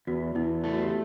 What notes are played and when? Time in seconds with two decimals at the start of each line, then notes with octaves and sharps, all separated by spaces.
0.07 E2 F#4
0.35 E2 E4
0.64 A3 E4
0.74 F#4
0.82 G4